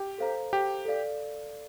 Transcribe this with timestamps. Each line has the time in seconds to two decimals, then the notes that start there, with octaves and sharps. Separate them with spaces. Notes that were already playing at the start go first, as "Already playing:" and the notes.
Already playing: G4
0.18 A4 C5 F5 A#5
0.53 G4
0.85 A4 D5 F5